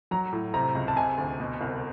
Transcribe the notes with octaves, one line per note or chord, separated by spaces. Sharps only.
F#3 A#5
A2
C3 A#5
C#2
A5
C3 G#5
D2
B2
C2